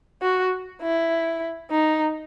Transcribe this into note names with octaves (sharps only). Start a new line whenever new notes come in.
F#4
E4
D#4